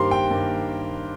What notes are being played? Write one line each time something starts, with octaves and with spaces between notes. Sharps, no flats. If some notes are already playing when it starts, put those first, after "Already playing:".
Already playing: G2 D#3 A#3 G4 A#4 C5 C6
G5
G2 D#3 A#3